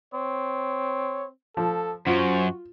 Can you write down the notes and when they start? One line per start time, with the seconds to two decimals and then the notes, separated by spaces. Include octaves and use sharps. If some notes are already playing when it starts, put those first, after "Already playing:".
0.14 C4 C#5
1.57 F3 A4
2.07 F#2 F4 F#4 C5